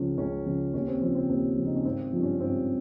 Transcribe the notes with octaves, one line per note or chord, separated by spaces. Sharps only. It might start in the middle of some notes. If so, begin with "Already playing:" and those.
Already playing: C#2 C#3 F3 C#4
C#2 C#4
C#3 F3
D#2 C#4
C4
C#3 F3 C4
C4
D#2 C4
C#3 F3
D#4
C#4
G#1 C4
G2 F3
C#4
G#1 C4